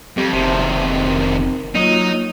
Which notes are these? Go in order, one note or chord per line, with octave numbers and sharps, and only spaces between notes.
F2 G3 G4
F1 C3 D#3 C5 E5 A5
A#4
F#3 A#3 D#4 F4 C#5